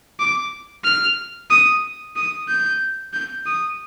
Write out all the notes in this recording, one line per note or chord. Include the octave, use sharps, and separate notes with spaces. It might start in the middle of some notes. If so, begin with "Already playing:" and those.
D6
F6
D#6
D#6
G6
G6
D#6